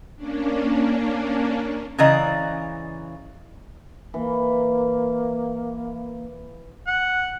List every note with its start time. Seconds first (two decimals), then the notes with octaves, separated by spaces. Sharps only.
0.16 A#3 C#4 D4
1.98 C#3 E3 D5 D#5 A#5
4.14 E3 A#3
6.87 F#5